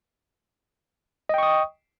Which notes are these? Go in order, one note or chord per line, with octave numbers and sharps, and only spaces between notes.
D#5 G5 C#6 D#6